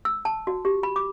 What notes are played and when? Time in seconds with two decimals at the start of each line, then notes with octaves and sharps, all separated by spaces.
0.05 E6
0.25 A5
0.47 F#4
0.65 G4
0.83 B5
0.96 D6